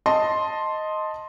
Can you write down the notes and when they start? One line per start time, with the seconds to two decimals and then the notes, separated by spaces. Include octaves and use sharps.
0.06 D#5 A5 C6